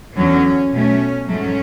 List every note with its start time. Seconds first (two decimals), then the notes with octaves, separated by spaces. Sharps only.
0.16 E2 D3 F#3 C#4
0.72 B2 F#3 A3 C#4
1.28 G#2 F#3 A3 C#4